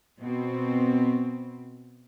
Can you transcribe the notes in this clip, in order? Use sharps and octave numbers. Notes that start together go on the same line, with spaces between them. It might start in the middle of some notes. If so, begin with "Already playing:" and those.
B2 C4